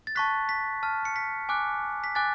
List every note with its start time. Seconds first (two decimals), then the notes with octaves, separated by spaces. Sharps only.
0.07 A6
0.15 A5 C#6 F#6 B6
0.49 B6
0.83 A5 F6
1.05 C#7
1.16 B6
1.49 G#5 D6 F#6
2.04 B6
2.15 G#5 D6 F#6 A6